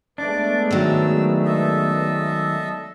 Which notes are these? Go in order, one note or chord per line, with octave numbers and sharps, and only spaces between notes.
G#3 A3 B3 D4 D6
D#3 F#3 E6
A4 D#5 E5